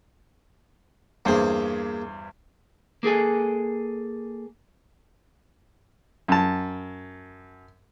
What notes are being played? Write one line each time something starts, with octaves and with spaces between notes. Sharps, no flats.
E2 G2 A#3 G#4 C5
A#3 G#4 A4 G#5
F#2 A5